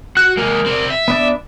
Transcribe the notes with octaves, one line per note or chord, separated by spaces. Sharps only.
F#4 F#6
G#3 A#3 A#4
C4 D5
E5
B3 D4 D5